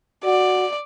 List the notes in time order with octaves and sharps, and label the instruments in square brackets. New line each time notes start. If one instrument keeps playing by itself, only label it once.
[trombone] F#4 [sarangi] D5